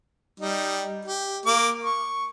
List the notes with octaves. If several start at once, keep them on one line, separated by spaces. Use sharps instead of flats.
G3 D#4
G4
A#3 D6
C#6